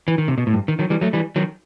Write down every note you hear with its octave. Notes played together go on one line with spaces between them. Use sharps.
E3
D#3
C3
B2
A2
G2
D#3
D#3 F#3
E3 G3
F#3 A3
E3 G3
D#3 F#3